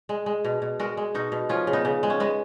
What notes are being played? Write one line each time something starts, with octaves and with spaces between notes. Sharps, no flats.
G#3
G#3
B2
B2
G#3 F#4 A#4
G#3
B2 D#4 F#4
B2
F3 C#4 F4
C#3
B3 D#4
C#3
G#3
C#4
G#3 B3